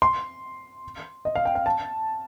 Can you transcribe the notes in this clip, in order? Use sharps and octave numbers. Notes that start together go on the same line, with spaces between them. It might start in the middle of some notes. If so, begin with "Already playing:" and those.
C6
D#5
F5
G5
F5
A5